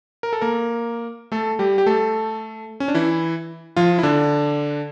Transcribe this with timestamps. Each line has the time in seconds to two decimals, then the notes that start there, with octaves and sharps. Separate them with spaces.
0.23 A#4
0.33 A4
0.41 A#3 A#4
1.32 A3 A4
1.59 G3 G4
1.78 G4
1.86 A3 A4
2.80 C#4
2.88 D4
2.94 E3 E4
3.77 F3 F4
3.98 E4
4.03 D3 D4